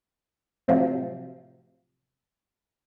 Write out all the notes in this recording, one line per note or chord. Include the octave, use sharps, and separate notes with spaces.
A2 C3 F3 F#3